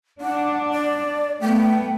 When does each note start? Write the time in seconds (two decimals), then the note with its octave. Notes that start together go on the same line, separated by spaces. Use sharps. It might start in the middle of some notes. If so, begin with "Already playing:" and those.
0.21 D4 F#5
0.72 D5
1.41 A3 B3 G5